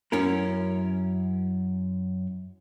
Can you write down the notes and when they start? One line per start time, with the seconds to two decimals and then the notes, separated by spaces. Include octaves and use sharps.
0.12 F#2 C#4 E4 A#4